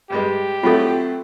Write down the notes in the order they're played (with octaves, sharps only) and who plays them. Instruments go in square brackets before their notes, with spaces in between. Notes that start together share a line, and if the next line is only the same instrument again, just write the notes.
[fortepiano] G2 G3 G#3 [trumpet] G4
[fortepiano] F#3 A3 E4 [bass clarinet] C4 [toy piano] F4 A4